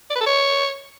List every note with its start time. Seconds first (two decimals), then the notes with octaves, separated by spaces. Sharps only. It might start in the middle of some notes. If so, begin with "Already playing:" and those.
0.10 D5
0.15 B4
0.21 A4
0.26 C#5